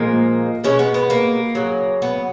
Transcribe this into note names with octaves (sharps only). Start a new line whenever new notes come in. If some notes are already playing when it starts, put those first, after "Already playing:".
Already playing: A#2 F3 G#3 A#3
B2 G#3 C#4
B3
B3
A#3
C#3 F#3
B3